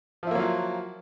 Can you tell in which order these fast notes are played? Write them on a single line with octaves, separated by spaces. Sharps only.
F3 E4 A#3 F#3 F4